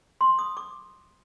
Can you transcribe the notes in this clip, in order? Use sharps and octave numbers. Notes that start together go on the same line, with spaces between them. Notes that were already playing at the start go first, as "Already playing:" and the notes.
C6
D#6
D6